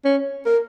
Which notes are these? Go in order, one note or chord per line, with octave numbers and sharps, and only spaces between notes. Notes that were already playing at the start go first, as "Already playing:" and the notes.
C#4
A#4